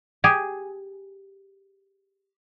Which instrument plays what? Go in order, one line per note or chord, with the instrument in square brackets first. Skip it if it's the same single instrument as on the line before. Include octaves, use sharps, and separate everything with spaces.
[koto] G4 G#4